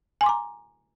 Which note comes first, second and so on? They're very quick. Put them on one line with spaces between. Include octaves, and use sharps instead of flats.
G#5 C6 D6 A#5